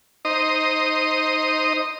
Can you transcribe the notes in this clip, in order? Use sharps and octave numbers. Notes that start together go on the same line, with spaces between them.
D#4 C5 D#5